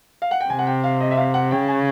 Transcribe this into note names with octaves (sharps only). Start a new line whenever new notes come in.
F5
F#5
G5
C3 G#5
F#5
G5
F5
D#5
E5
F5
F#5
C#3 G5
G#5